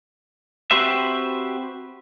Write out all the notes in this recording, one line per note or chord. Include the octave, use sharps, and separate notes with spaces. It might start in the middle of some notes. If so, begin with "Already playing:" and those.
C4 F#4 G4 B4 C5 E5